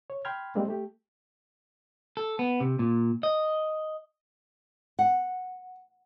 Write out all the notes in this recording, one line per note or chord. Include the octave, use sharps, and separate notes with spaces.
C#5
G5 B5 C6 F6 G#6
G3 G#3 A#3 C4 D4
A3 G4
A4
B3
C3
A#2
D#5
F#5